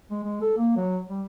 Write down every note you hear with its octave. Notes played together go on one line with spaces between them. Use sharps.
G#3
G#3
A4
A#3
F#3
G3